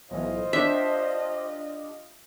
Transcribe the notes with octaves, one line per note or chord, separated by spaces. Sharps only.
B1 A2 E3 F4 C5 D#5
D4 G4 E5